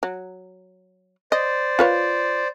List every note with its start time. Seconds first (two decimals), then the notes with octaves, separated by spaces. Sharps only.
0.03 F#3
1.32 C5 D5 D#5
1.79 F4 B4 C#5